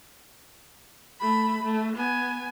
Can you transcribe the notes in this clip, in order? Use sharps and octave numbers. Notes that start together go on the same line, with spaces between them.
A3 B5
A3
B3 G#5